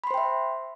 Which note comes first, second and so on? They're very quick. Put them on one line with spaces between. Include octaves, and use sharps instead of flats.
B5 C6 C5 G5 E5